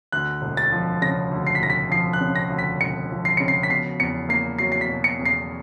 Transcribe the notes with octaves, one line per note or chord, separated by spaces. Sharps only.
D2 F#6
E1
A6
F3
C#3 A#6
D2
C7
B6
E1 A#6
B6
F3 C7
F#6
C#3
A#6
D2
B6
E1 C#7
F3
C7
C#3 C#7
C7
B6
B2 C7
E2 C#7
A#3 C7
F#3 C7
C7
B6
B2
C#7
E2
C7